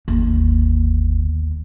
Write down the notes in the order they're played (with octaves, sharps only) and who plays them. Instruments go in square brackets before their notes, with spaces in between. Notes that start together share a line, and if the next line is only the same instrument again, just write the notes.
[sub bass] G1 [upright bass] D#2